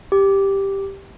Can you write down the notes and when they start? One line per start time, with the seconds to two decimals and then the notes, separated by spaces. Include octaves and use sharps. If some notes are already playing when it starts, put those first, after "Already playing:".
0.12 G4